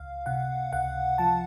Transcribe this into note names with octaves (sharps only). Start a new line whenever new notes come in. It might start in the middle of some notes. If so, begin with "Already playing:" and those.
Already playing: C#2 F5
C3 F#5
C#2 F#5
F3 A5